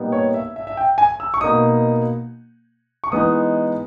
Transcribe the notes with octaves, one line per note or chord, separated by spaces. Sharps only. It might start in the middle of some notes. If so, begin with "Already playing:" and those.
Already playing: A#2 G3 B3 D#4
C#5
E5
E5
E5
G5
G#5
E6
C#6
B2 A#3 D#4 D#6
C#6
E3 G#3 B3 D#4 D#6